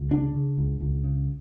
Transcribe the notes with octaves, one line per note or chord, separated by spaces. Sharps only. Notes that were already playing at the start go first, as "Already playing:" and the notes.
Already playing: C#2
C#3 D4
C#3
C#2
C#2
C#3